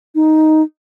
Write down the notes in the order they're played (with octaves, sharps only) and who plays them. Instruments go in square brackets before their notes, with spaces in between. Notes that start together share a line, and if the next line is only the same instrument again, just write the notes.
[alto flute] D#4